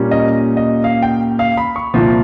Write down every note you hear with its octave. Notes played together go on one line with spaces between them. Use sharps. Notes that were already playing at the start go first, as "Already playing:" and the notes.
Already playing: A#2 G3 A#3 C#4
D#5
D#5
F5
G5
F5
B5
C#6
C2 A#2 F3